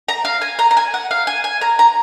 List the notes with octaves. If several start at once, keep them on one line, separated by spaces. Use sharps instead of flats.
A#5
F5
G#5
A#5
A#5
G#5
F#5
F5
G#5
G#5
A#5
A#5